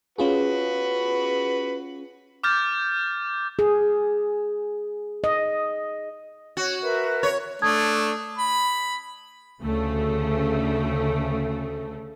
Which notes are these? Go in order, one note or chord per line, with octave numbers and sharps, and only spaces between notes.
C#4 F4 F#4 G#4 B4
D6 F6 G6 A6
G#4
D#5
F#4 C#5
A#4 B4 E5
C#5
A3 D4 A5 D#6 G#6
B5
D2 C#3 A3